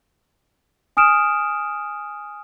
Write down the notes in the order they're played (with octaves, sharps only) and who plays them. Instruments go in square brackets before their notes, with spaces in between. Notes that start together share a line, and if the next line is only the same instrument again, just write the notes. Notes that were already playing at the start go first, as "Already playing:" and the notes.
[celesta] G#5 D#6 F6 D7 E7